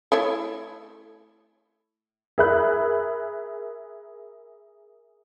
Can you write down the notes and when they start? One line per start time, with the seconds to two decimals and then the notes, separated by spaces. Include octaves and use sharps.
0.12 A3 E4 C#5
2.38 G#4 A#4 E5 B5 F#6